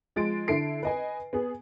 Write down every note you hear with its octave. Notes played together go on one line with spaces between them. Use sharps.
F3 G#3 A6 D7
D3 E4 A4 E5 C7 D7
B4 D#5 G#5
B3 G#4